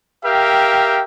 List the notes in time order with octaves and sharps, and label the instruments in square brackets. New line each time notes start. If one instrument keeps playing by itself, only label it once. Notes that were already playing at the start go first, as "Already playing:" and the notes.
[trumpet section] G4 A#4 E5 F5 G5